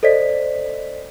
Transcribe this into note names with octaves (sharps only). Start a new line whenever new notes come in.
A4 C5 D5 D#5 B6